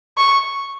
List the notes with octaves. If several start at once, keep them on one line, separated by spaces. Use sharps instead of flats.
C#6